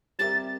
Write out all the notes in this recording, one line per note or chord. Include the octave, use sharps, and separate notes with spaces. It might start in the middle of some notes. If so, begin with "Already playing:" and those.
G3 C4 G4 A#4 E5 A6